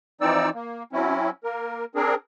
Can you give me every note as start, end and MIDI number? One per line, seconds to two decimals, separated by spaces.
0.21 0.49 52
0.21 0.49 53
0.21 0.49 60
0.21 0.49 63
0.21 0.49 74
0.21 0.49 88
0.54 0.83 58
0.93 1.30 54
0.93 1.30 60
0.93 1.30 61
0.93 1.30 64
1.44 1.85 58
1.44 1.85 70
1.95 2.15 60
1.95 2.15 62
1.95 2.15 68
1.95 2.15 70